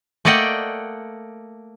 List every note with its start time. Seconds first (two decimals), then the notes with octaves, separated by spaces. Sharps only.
0.25 A3 A#3 D5 D#5 F#5 G5